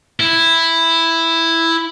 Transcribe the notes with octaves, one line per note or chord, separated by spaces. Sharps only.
E4